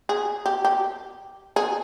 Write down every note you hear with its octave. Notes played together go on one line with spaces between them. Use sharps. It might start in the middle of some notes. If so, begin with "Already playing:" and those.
G#4
G4
G4
G#4